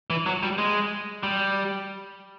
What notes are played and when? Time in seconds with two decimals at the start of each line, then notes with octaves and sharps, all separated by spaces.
0.10 E3
0.26 F#3
0.43 G3
0.58 G#3
1.23 G3